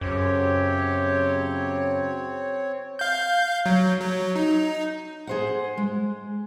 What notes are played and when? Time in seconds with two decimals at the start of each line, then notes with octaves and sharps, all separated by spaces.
0.01 F#2 C#3 F#3 C4 G4 C#5
2.99 F5 G6
3.66 F#3
4.00 F#3
4.35 D#4
5.27 G#4 C5 F#5
5.77 G#3